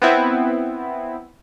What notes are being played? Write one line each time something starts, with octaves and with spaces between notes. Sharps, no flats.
B3 C4 E4